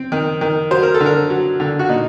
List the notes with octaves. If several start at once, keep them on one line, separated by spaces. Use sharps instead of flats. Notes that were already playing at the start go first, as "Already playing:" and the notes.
Already playing: C4
D#3
D#3
F#3 C5
A#4
A4
D3
A#4
F#3
D3
F#4
A#2 D#4